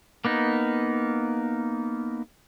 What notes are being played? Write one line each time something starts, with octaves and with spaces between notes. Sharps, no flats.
A#3 B3 D#4